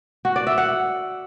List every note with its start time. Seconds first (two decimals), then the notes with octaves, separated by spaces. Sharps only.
0.25 F#4
0.36 D5
0.47 E5
0.58 F#5